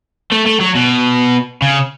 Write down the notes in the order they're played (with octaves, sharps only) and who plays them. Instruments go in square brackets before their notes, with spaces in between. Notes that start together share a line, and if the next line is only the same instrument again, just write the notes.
[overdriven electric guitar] A3
A3
F#3
B2
C#3